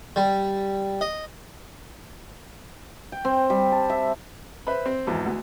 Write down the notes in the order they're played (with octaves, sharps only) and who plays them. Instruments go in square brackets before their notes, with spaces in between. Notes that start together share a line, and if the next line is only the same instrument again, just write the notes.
[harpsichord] G3
D#5
[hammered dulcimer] G5
C4
G3
A5
E5
[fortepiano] B4 C5 E5 B5
C4
G#1 E2
D2